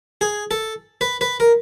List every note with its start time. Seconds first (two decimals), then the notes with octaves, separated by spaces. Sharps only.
0.21 G#4
0.51 A4
1.01 B4
1.21 B4
1.40 A#4